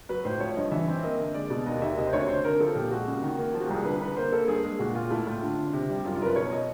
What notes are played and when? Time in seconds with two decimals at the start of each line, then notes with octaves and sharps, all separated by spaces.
0.09 F#3 B4
0.25 A2 C5
0.40 F3 C#5
0.56 G2 D#5
0.71 E3 E5
0.87 C4
1.03 A#3 D#5
1.19 D3
1.34 G#3 D5
1.50 B2
1.66 D#2 D#5
1.82 D#2 E5
1.97 C3 D#5
2.07 C5
2.13 D2 C#5
2.28 D3 C5
2.44 D3 A#4
2.60 F3 A4
2.75 A#2 G4
2.91 G#3 F#4
3.07 C#3
3.22 D#3
3.38 A#3
3.54 F3 F4
3.60 F#4
3.64 G4
3.70 C2 G#4
3.85 D3 B4
4.01 D3 B4
4.17 A#3 C5
4.32 A#3 A4
4.48 G2 G#4
4.63 G#3
4.79 A#2 F#4
4.95 A#2 F4
5.10 A3 E4
5.26 A2 F4
5.42 D3
5.58 D3
5.73 C3
5.89 G3
6.05 F#2 F4
6.15 F4
6.21 F#2 A#4
6.26 B4
6.36 B2 C#5
6.51 D#5